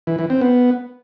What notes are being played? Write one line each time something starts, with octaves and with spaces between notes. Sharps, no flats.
E3
E3
C4
B3